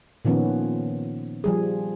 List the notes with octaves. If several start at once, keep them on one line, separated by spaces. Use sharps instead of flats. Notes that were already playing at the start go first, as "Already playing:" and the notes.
A#2 D#3 F3 B3 C#4
F3 G3 G#4